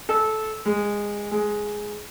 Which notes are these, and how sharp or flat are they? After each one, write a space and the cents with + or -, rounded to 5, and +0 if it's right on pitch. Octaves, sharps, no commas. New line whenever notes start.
A4 -15
G#3 -15
G#3 +5